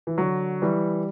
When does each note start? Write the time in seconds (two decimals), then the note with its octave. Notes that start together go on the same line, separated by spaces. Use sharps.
0.07 E3
0.18 D3 F#3
0.62 E3 G3